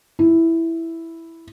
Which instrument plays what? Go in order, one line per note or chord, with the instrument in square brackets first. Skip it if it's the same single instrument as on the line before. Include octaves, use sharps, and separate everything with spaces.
[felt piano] E4